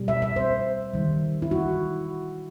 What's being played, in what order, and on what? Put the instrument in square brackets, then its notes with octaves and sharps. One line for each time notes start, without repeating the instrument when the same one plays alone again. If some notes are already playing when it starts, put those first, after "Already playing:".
Already playing: [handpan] B2 G3
E5
E5
C5
D#3 G3
E4
F#4